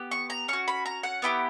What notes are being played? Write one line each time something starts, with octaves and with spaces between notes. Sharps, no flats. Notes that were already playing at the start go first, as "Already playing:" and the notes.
Already playing: B3 G4
C#6
A#5
C#4 F#4 C#6
B5
A#5
F#5
B3 E4 G4